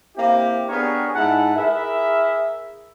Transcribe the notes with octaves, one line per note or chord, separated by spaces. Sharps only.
A#3 C4 E4 G4
B3 D4 G4 G#4 A#4 C#5
G#2 E4 G#4 E5 F#5 A5
E4 G#4 A#4 E5